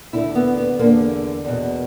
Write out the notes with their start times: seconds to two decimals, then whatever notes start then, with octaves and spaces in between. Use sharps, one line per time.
0.13 D2 D3 E4
0.35 B3
0.58 B3
0.79 E2 D3 A#3
1.44 E2 B2